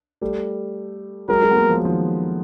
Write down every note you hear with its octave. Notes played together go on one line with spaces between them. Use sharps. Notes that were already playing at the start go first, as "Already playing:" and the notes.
G3 A3
F#3 G#3 A#4
F#3 G#3
B3
G#3 A#3
F3
F#3
D#3 F3